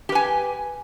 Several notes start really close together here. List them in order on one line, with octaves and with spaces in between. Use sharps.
G4 B4 G#5